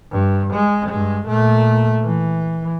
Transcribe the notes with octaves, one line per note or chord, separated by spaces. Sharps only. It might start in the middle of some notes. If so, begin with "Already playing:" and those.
G2
G#3
G2 G#3
A#2 A3
E3